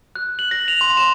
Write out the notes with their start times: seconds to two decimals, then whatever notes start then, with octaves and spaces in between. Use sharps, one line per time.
0.15 F#6
0.39 F#7
0.51 A#6
0.68 F7
0.81 C6
0.97 E7